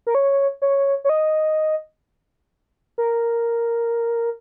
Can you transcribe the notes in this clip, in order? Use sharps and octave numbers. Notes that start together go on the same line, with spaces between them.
A#4
C#5
C#5
C#5
D#5
A#4